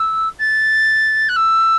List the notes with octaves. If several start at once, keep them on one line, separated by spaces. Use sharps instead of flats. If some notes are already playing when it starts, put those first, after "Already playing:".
Already playing: E6
A6
F#6
E6